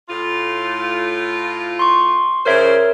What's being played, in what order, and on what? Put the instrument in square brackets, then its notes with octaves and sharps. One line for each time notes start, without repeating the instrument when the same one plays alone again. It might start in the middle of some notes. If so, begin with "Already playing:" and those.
[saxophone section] A2 F4
[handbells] C6 C#6
[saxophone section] C#3 F3 C5 [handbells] A#4 C#5 E5